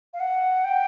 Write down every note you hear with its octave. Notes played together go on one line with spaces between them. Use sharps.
F5
F#5
G5